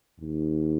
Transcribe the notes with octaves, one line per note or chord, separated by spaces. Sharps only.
D#2